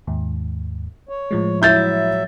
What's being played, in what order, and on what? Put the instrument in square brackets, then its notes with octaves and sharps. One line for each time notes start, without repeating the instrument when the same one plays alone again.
[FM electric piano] D#2 G#2
[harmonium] C#5
[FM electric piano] A2 F3 G#3
[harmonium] F#3 E5 [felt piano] E4 G6 A6